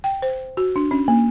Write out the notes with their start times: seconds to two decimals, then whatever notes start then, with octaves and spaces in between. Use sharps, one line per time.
0.04 G5
0.22 C5
0.57 F#4
0.76 D4
0.91 C#4
1.08 A#3